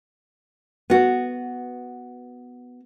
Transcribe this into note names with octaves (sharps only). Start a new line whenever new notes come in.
B3 F#4